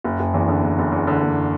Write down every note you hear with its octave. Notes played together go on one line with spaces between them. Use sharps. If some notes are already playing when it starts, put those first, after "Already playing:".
F#1
F#1
E2
D3
F#1
F#1
E2
D3
F#1